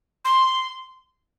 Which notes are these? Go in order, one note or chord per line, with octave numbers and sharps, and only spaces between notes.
C6